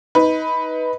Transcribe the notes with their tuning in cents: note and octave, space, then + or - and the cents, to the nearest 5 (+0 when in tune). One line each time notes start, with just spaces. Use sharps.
D#4 +25 B4 +0